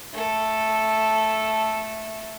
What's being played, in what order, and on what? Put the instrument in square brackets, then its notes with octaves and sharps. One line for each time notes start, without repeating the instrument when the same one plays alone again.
[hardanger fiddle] A3 A4